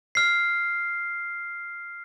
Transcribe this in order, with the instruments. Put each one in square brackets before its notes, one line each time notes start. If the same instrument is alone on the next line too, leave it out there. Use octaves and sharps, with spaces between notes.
[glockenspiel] F6 C7